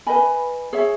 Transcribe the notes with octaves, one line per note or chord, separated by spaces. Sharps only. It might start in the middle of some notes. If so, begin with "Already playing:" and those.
B4 D#5 G#5 B5
G#4 C#5 E5